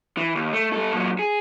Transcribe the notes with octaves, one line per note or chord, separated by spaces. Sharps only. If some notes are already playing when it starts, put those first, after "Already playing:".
E3
D#2
A3
G3 A4
A#2 F#3
G#4